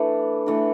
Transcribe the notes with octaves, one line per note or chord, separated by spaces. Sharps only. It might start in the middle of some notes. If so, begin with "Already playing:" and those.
Already playing: E3 A3 D4
E3 A3 D4